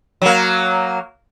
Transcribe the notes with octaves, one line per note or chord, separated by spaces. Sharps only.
F#3 A#3